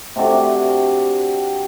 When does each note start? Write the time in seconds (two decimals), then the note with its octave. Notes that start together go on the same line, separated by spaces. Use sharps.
0.16 C3 C4 D4 F#4